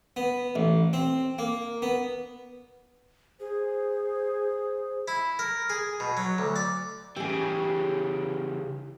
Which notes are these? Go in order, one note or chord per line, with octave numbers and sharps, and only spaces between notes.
B3
A1
C4
A#3
B3
G#4 C5
E4
A#4
G#4
B2
F#3
D2
D5
C#3 E3 G4 G#4